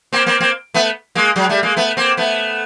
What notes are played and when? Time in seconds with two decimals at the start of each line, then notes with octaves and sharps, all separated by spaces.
0.13 A#3 C4
0.26 A#3 C4
0.40 A#3 C4
0.74 A3 B3
1.15 G#3 A#3
1.36 F#3 G#3
1.49 G3 A3
1.63 G#3 A#3
1.76 A3 B3
1.97 A#3 C4
2.17 A3 B3